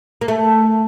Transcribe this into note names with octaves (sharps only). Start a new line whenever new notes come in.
A#3
A3